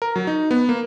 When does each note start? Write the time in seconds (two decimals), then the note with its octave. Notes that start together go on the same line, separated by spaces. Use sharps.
0.02 A#4
0.16 F#3
0.27 D#4
0.51 B3
0.69 A#3